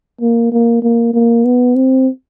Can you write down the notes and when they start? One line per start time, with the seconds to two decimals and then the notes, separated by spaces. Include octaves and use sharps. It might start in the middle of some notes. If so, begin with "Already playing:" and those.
0.21 A#3
0.52 A#3
0.83 A#3
1.14 A#3
1.45 B3
1.76 C4